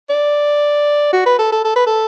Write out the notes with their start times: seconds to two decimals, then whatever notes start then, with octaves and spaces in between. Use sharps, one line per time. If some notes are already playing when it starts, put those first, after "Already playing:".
0.10 D5
1.13 F#4
1.26 B4
1.39 A4
1.52 A4
1.65 A4
1.76 B4
1.87 A4